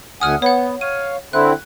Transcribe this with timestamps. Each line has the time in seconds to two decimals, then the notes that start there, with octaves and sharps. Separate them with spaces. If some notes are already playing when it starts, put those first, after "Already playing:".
0.21 D2 F#5 G#5 D#6 F6
0.42 B3 C#5 F#5
0.81 C#5 F5 D#7
1.33 D3 C4 E4 F#6